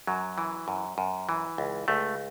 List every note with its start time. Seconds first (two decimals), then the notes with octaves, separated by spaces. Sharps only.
0.07 F#2 F#3
0.38 E3
0.68 F#2
0.98 F#2
1.29 E3
1.58 C#2
1.88 C#2 A3